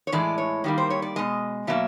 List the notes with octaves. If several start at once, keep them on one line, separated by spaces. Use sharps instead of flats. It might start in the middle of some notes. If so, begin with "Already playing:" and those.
C#5
A2 E3 G#3 D5
C#5
D#3 G3 A#3
C5
C#5
D5
B2 G#3 D#5
B2 F#3 A#3 E5